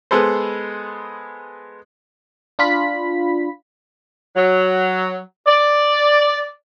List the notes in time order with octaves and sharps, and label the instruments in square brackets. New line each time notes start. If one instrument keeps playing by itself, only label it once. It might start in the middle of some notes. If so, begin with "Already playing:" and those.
[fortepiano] G#3 B3 G#4 A4 B4 C5
[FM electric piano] D4 F4 B5 B6
[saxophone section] F#3
D5